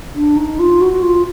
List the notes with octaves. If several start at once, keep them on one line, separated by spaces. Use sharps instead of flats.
D4
D#4
F4
F#4
F4